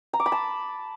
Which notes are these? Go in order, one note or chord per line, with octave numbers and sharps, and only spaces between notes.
A#5
D6
B5
A5